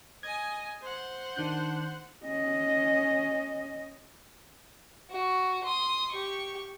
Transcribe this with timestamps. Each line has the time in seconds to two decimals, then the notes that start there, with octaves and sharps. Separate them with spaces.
0.23 D#5 G#5 G#6
0.81 C5 F#5
1.36 D#3 D4 F#6 G6
2.26 C#4 D#5
5.10 F#4
5.64 C6 D#6
6.11 G4 C#6